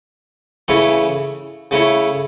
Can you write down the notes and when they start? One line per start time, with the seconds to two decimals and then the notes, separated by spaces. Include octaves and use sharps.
0.68 C#3 E3 A3 E4 C#5
1.71 C#3 A3 E4 C#5